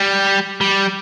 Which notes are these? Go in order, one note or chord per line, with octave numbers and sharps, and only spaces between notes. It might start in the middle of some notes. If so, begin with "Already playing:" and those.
Already playing: G3
G3